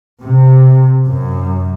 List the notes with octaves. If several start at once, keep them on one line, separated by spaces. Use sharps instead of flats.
C3
F#2